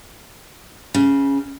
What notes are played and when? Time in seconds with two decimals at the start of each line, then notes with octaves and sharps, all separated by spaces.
0.94 C#3